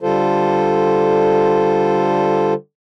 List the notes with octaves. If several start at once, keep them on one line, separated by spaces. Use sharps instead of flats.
D3 G3 F4 A4 C5